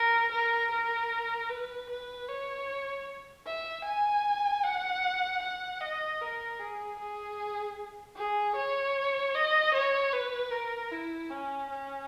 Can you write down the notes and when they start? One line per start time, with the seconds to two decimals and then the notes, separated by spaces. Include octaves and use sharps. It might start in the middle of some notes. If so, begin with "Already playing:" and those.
Already playing: A#4
0.32 A#4
0.71 A#4
1.49 B4
1.89 B4
2.28 C#5
3.47 E5
3.85 G#5
4.64 F#5
5.42 F#5
5.81 D#5
6.21 A#4
6.59 G#4
6.99 G#4
8.16 G#4
8.56 C#5
9.35 D#5
9.74 C#5
10.13 B4
10.52 A#4
10.92 E4
11.30 C#4
11.70 C#4